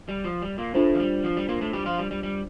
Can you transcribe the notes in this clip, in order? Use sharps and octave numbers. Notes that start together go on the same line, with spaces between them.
G3
F3
G3
A#2 A#3
A2 A3 D4 F4 C5
F3
G3
F3
G3
A#2 A#3
A2 A3
G3 G4
F3 F4
G3
G3
G3